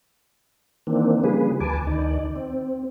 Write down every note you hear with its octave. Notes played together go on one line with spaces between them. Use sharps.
D#3 E3 A#3 C4 D4
C#3 F3 G3 A#3 G#4 B4
D2 B4 G#5 A5 D6
D2 D#3 D#4 D5
C4